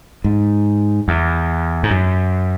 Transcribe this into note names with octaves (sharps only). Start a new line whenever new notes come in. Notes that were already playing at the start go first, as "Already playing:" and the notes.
G#2
E2
G#2
F#2